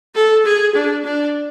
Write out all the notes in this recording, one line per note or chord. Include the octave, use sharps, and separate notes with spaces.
A4
G#4
D4
D4